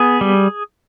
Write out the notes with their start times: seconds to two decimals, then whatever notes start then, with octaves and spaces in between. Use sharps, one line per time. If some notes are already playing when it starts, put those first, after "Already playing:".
Already playing: B3 G#4
0.21 G3